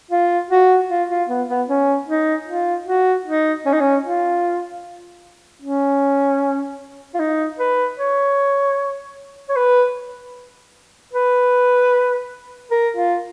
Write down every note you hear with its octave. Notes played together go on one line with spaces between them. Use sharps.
F4
F#4
F4
F4
B3
B3
C#4
D#4
F4
F#4
D#4
C#4
D#4
C#4
F4
C#4
F4
D#4
B4
C#5
C#5
B4
B4
A#4
F4